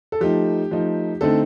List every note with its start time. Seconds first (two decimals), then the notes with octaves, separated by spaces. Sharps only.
0.12 A4
0.21 F3 A3 D#4 G4
0.71 F3 A3 D#4
1.21 D3 A3 C4 D#4 A4